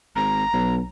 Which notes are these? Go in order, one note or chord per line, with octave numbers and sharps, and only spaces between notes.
G#1 A#5
B1